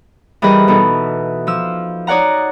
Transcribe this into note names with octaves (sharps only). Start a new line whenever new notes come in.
E3 G3 G#4 A#4 B4 D#5
B2 E3 D#4 A4
F3 E6
D#4 C#5 D5 F#5 A#5